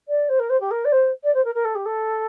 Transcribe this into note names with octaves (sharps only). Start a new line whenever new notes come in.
D5
C5
A#4
C5
G4
A#4
D5
C5
D5
C5
A#4
A#4
A4
G4
A4